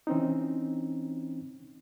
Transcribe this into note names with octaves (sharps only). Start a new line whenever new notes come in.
E3 C4 C#4 D#4